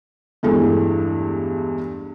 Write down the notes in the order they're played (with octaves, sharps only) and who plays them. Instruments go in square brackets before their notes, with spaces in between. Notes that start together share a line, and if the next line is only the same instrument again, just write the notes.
[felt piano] E2 G2 E3 G#3 A3